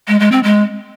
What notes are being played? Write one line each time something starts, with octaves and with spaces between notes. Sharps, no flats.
G#3
G#3
C4
G#3